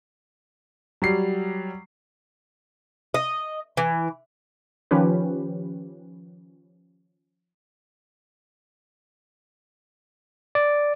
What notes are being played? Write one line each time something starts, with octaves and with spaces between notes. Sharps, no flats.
F#3 G3 C7
D#5
E3
D#3 F3 C#4 G4 B4
D5